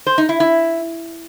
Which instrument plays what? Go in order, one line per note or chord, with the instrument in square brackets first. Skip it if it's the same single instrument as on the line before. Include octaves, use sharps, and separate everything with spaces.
[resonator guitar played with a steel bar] C5
D#4
E4
E4